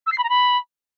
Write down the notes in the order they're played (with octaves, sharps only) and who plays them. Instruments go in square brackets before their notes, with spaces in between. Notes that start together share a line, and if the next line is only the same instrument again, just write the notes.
[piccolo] E6
C7
B5
A#5
B5